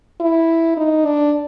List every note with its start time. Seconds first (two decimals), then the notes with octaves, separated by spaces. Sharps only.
0.20 E4
0.77 D#4
1.06 D4